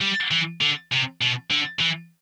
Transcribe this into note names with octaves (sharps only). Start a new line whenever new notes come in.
G3
E3
D3
C3
B2
D3
E3